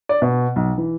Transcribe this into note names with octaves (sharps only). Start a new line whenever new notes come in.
D5
B2
B1
E3